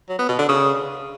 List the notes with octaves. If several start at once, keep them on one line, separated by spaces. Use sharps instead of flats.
F#3
B3
B2
D3
C#3